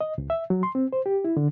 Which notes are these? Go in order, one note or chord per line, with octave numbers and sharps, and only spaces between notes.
D#5
C#2
E5
F#3
C6
C4
C5
G4
E4
D3